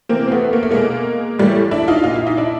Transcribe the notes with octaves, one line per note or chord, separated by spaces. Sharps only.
C3 E3 A#3 C4
C4
A3 B3
A#3
A3
B2 G#3 A#3
A2 E3 G3 A3
D4 E4
D#4 F4
A#2 F4
E4
D#4
D4 E4